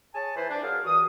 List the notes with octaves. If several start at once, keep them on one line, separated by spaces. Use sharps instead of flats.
G#4 C#5 G#5 A5
E3 E4 B4 C5
D4
F#3 G#4 A#4 F5
G2 E3 F#4 D#6